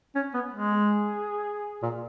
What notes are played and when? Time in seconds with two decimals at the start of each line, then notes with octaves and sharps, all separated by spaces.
0.15 C#4
0.34 B3
0.53 G#3
0.72 G#4
1.83 A#2